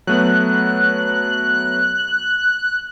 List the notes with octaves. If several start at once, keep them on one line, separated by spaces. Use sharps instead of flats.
F#3 A3 B3 F#6